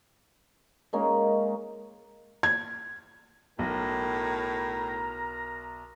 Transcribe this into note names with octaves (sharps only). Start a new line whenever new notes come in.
G#3 A#3 C#4 D#4
G#6
B1 A2 A#4 A#5